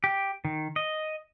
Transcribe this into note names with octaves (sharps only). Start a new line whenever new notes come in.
G4
D#3
D#5